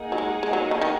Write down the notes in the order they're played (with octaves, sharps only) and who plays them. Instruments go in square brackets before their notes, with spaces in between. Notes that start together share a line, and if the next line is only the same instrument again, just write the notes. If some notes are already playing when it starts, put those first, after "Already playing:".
Already playing: [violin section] A#3 D#4 G#4 F#5
[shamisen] F#3
G#3
G#3
F#3
D#3
D#3